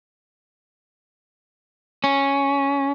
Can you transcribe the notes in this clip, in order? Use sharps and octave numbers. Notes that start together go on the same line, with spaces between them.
C#4